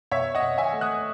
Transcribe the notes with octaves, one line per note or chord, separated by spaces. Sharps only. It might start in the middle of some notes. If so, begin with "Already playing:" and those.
B2 C#5 E5
D#5 F#5
B2
E5 G#5
A3
D#6 F#6